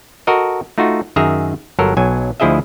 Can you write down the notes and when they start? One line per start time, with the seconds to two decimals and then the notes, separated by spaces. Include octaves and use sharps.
0.27 F#4 A4 A#4 D#5
0.78 A3 D#4 F4 F#4
1.16 F#2 D#3 G#4 E5 A#5
1.79 G1 F#3 A4 A#4
1.97 B1 F#3 G#5
2.40 D2 F3 E4 G#4 D#5 E5